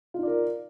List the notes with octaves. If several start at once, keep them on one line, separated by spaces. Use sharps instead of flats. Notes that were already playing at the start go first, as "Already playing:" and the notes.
D#4 F4 A#4 D5